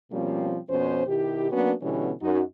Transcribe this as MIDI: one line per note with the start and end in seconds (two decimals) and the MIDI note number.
0.12 0.58 47
0.12 0.58 53
0.12 0.58 55
0.12 0.58 58
0.12 0.58 60
0.12 0.58 61
0.69 1.04 41
0.69 1.04 47
0.69 1.04 53
0.69 1.04 61
0.69 1.04 72
1.07 1.51 47
1.07 1.51 51
1.07 1.51 64
1.07 1.51 67
1.51 1.72 54
1.51 1.72 58
1.51 1.72 59
1.51 1.72 61
1.51 1.72 62
1.51 1.72 66
1.82 2.12 47
1.82 2.12 50
1.82 2.12 52
1.82 2.12 55
1.82 2.12 59
1.82 2.12 61
2.21 2.41 42
2.21 2.41 63
2.21 2.41 66